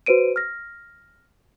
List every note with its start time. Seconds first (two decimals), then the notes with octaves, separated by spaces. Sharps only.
0.06 F#4 B4 C5 D7 D#7
0.36 F6 A#6